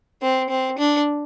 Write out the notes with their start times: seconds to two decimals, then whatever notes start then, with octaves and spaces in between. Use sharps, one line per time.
0.22 C4
0.50 C4
0.78 D4